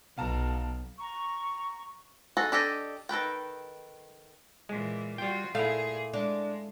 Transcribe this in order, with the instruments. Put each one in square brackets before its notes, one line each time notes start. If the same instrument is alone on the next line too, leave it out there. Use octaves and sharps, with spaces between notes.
[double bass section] B1 [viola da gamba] B2 [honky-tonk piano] F5 A5 A#5
[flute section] A#5 C#6
[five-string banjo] D#4 F#4 G#4 A4
D4 G4 A4 D#5
D#3 A4 B4 G5
[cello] A#2 E3 [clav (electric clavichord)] G#3
[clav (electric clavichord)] G3 G5 [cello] F4 F#4
[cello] A#2 G#4 [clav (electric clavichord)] A3 E4 [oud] F5
[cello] G#3 [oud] D4